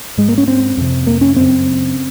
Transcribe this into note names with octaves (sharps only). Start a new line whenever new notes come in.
G#2 G#3
A#3
C#4
C4
F2 C3
A#3
C#4
F#2 C#3 C4